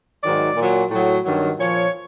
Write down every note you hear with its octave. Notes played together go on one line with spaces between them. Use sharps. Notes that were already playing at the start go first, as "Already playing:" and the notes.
G#2 D#3 F#3 D5
A#2 F#3
A2 F#3
G2 D#3 F#3
A#2 F3 C#5